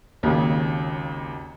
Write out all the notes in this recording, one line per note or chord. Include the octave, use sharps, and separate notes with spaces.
G#1 D#2 C#3 A#3